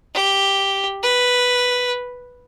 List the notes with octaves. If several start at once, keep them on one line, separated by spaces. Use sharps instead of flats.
G4
B4